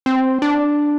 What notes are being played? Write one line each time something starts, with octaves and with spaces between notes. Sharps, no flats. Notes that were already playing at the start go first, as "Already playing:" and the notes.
C4
D4